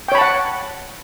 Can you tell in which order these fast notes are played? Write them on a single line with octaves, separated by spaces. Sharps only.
G5 C#5 B5 A5 F#5